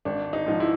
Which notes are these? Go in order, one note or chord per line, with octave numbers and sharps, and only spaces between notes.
G#1 D4
D#4
G#2 F3
E4